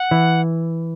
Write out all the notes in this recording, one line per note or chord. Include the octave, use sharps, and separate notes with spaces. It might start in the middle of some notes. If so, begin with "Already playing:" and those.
Already playing: F#5
E3